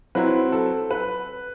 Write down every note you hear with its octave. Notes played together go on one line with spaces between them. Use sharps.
F#3 C4 E4 B4
A4
B4